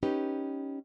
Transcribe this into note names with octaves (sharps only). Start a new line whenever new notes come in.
C#4 D#4 G4 B4